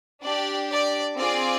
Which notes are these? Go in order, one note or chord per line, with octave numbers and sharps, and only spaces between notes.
D4 G4 D5
D5
C4 F4 G#4 D5